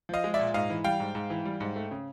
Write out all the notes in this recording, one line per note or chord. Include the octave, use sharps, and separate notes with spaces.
F3 D#5 F5
G#3
D5 E5
A#2
G#2 D#5 F5
E3
G3 F5 G5
G#2
G#2
E3
G3
G#2
A3
C#3